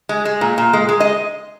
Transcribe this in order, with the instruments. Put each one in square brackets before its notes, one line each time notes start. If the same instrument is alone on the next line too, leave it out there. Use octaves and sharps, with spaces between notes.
[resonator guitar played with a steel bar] G#3
G#3
A#2
A#2
G#3
G#3
D#5